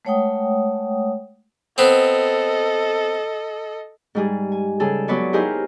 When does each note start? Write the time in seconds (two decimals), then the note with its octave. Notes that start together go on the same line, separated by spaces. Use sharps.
0.05 G#3 A3 C#5 F#5 G5 D#6
1.78 B3 C4 A4 D#5
4.15 G#2 G3 G#4
4.52 G#5
4.80 C#3 G3 G#4 A4
5.08 F#3 B3 B4 C#5 D5
5.33 D#4 E4 G4 G#4 A#4 C5